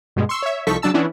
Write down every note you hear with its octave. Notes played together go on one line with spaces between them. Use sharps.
G2 B2 G#3
C6 C#6 E6
C#5 E5
C2 F3 D#4 A4 C#6 B6
C#3 F#3 D4 A5 E6
E3 B3 C#4 D4 E4